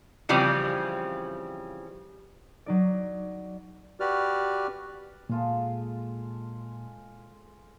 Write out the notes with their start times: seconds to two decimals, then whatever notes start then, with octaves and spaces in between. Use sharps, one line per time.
0.29 C#3 E3 F3 G3 C4
2.66 F#3 D#4 D5
4.00 F#4 G4 B4 D5 F6
5.29 A#2 G#3 F4 A4